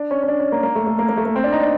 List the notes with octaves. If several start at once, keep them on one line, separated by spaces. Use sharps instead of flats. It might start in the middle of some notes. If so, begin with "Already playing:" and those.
Already playing: D4
C#4
C#4
D4
C#4
A#3
A#3
A3
A3
A#3
A#3
A3
A#3
C4
D4
D#4
D4